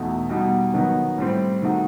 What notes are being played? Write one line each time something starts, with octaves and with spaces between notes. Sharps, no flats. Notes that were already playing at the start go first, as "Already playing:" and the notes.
Already playing: E2 B2 A3 D#4 F#4
B2 G3 D#4 F#4
D#3 F#3 B3 D#4
A2 G3 C4
D#3 A3 D#4 F#4